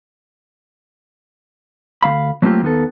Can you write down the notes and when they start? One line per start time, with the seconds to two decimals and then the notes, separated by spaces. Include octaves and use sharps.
2.03 D2 F#3 F5 B5
2.42 F#3 A3 A#3 C4 F4 G4
2.62 D#2 D#3 B3 A4